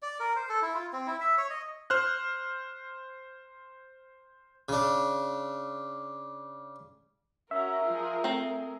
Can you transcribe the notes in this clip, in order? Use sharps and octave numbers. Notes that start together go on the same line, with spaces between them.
D5
A#4
C5
A4
E4
F4
C4
E4
E5
C#5
D#5
C5 F6 F#6
C#3 D4
C#4 F#4 A#4 E5 A#5
F3 F4 G#4
A3 C4 G#4 A#5